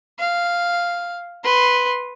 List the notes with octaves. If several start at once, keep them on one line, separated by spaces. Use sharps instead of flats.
F5
B4 C6